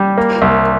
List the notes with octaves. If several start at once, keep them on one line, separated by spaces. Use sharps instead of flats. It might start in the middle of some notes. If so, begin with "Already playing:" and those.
Already playing: G3
A#3
C2